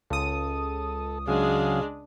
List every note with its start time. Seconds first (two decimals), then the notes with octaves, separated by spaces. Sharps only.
0.10 C#2 A4 D#6
1.28 C#3 F#3 G#3 D4 G#4 F5